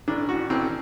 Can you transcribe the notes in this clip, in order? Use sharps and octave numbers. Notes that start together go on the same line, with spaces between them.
A1 D4
A2 F#4
A1 C4